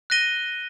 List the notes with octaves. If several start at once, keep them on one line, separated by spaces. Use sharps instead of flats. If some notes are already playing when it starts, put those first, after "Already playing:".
F#6 A#6 D#7 G7